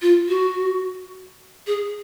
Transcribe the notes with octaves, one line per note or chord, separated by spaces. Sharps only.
F4
F#4
G#4